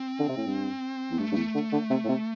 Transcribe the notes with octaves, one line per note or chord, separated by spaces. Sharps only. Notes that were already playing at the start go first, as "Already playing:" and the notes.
Already playing: C4
D3
C3
A2
G2
E2
G2 A3
G2
E2
D3
D3
C3
A2
C3